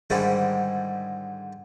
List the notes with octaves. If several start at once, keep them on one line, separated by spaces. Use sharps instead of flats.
G#2 D3 D#3 G3 G#3 E4